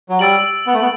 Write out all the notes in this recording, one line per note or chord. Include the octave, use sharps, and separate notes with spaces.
F#3
G3 E6 A6 D7 F#7
B3
A3
B3